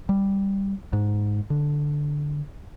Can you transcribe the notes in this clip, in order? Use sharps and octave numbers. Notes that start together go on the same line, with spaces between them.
G3
G#2
D3